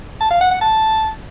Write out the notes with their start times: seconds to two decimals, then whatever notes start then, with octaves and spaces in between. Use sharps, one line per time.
0.20 A5
0.31 F5
0.41 F#5
0.51 F#5
0.61 A5